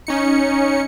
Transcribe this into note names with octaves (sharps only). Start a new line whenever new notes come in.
C#4 D#4 C#7